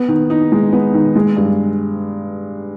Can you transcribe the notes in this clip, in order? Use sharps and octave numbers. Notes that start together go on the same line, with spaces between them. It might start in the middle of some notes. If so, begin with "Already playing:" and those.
Already playing: B3
D#3
D#4
G#3
B3
D#3
G#3
G2